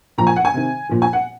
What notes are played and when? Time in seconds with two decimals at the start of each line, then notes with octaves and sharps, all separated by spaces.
0.18 A#2 F3 A#5
0.27 G#5
0.36 F#5
0.45 G#5
0.54 C3 D#3
0.89 A#2 F3
1.02 G#5
1.13 F#5